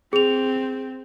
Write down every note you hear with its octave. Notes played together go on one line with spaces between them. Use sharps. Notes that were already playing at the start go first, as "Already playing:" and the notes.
C4 G#4 F7